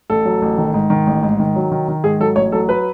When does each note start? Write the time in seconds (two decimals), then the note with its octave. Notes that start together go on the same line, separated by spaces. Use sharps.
0.10 A1 A4
0.25 F#3
0.42 A1
0.58 D#3
0.74 G#2
0.90 D#3
1.07 A1
1.23 G#2
1.40 D#3
1.55 F#3
1.71 D#3
1.88 D#3
2.04 G#2 G#4
2.20 F#3 A4
2.36 A1 C#5
2.52 F#3 A4
2.69 B4